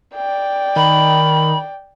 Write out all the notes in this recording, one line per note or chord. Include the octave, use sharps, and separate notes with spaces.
D5 G5
D#3 B5